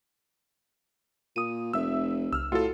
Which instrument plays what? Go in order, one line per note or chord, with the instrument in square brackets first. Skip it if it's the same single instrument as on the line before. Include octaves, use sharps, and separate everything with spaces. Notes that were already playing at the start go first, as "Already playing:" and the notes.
[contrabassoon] A#2 [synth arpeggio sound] D#6 D#7
[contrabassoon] F1 [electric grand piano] E5 E6
[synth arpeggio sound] C2 [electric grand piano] E6 F6
[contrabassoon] A2 [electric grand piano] F4 A4 [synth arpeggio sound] F#4